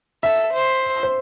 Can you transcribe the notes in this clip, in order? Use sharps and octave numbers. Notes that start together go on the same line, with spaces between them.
A4 E5
C5
C5